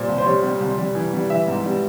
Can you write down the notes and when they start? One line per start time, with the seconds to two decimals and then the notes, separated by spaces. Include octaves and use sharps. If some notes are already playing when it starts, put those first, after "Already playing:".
Already playing: A#2 G3 C5
0.08 C2
0.18 C5
0.26 G3 C#5
0.43 G3
0.60 C2
0.78 G3
0.95 E3
1.13 G3
1.30 E3 E5
1.48 G#2
1.65 G3